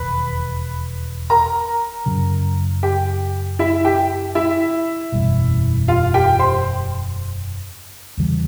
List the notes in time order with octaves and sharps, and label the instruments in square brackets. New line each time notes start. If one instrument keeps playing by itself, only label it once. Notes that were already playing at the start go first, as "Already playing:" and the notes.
Already playing: [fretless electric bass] E1 D#2 [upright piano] B4 B5
[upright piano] A#4 A#5
[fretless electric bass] F#2 C#3 F#3
[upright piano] G4 G5
E4 E5
G4 G5
E4 E5
[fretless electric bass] F#1 E2 B2 G3
[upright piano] F4 F5
G4 G5
C5 C6
[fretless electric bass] E2 C#3 E3 G3